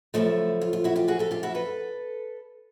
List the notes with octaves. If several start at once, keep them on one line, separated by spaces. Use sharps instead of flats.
F#2 C#3 F3 A3 E4
F4
F4
E4 F#4
F4 G4
F#4 G#4
G4 A4
F4 G4
E4 F#4
A4 B4